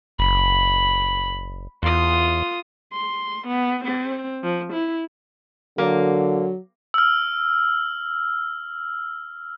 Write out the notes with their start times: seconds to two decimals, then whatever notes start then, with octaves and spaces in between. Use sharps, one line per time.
0.19 F#1 B5
1.83 E2 F4 D#6
2.93 C6
3.47 B3
3.84 C4
4.43 F3
4.73 E4
5.78 D3 F#3 A#3
6.94 E6 F6